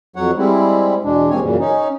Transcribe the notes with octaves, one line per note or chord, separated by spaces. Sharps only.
F2 F#3 C#5 F#5
G3 G#3 C4 E4
E2 B2 G#3 D4
D#2 G#2 A#3 C4 C#5 G#5
F#2 A#2 C#3 E3
C#4 D#4